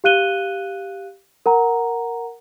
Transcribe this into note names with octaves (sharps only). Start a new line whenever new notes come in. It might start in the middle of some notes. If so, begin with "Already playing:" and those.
G4 F5 F#6 D#7 G7
A#4 F#5 A#5